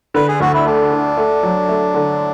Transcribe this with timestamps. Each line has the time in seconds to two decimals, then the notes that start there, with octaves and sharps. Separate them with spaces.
0.14 D3 B4
0.28 G#4
0.40 D2 F#4
0.54 E4
0.66 A3 D4
0.92 D3
1.17 A3
1.43 F#3
1.69 A3
1.94 D3